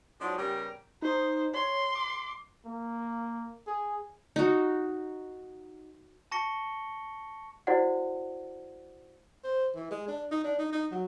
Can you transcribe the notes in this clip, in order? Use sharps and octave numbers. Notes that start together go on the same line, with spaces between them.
F3 F#3 G#3 D4 D#4
C#3 G3 B3 G4 A#4
D#4 C5
C#5 C6
D6
A#3
G#4
D#4 F#4
A5 C#6 A#6 C#7 G7
E4 F#4 C5 D5 F#5
C5
E3
G#3
D4
D#4
D4
D#4
D#4
F#3